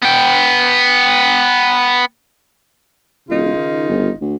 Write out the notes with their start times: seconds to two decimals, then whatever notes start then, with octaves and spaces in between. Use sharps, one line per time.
0.02 B3 G5
3.30 E1 C#3 D#4 F4
3.55 D#3
3.89 G1
4.21 D2